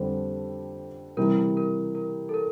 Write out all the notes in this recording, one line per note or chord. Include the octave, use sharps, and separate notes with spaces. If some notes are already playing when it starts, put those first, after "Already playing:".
Already playing: F2 D3 G3 D4 C5
C3 E3 G3 A#4
A#4
A#4
A4
A#4